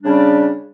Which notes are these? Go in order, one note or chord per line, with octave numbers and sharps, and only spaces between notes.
C#3 G3 D4